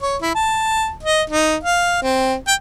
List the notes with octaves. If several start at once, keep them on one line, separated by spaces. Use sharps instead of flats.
C#5
E4
A5
D#5
D#4
F5
C4
G5